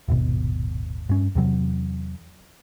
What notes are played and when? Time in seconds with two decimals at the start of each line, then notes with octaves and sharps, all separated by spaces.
0.08 D#1 G#1 B2
1.09 G2 C#4
1.35 E2 C3 F#3